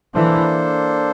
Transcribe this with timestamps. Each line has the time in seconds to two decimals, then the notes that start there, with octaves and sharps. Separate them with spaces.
0.14 E3 A#3 D4 A4 C5